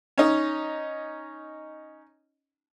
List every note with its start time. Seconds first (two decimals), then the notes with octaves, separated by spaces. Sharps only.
0.18 C#4 D#4